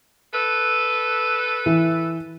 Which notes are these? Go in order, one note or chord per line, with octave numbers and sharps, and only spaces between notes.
A4 B4
E3